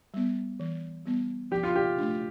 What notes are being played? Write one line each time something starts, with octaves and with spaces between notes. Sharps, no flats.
G3 B3
E3
G3 B3
F3 G4
F4
G4
A3 D4